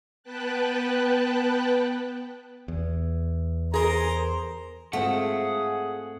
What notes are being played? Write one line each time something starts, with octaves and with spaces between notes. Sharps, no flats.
B3 B4 G5 A5 F#6
E2
G#4 A#4 C5 A#5
G#2 A3 C4 F4 G#4 F#5